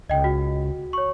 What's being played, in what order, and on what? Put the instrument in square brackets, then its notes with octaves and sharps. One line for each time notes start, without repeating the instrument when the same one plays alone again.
[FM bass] C#2 [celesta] D#5 G5
[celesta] F#4
C#5 C#6